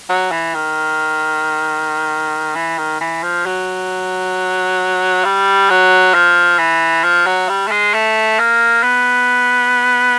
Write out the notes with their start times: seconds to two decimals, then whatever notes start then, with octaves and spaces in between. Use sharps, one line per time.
0.09 F#3
0.31 E3
0.54 D#3
2.55 E3
2.78 D#3
3.00 E3
3.23 F3
3.46 F#3
5.24 G3
5.70 F#3
6.14 F3
6.59 E3
7.04 F3
7.26 F#3
7.49 G3
7.67 A3
7.71 G#3
7.94 A3
8.39 A#3
8.83 B3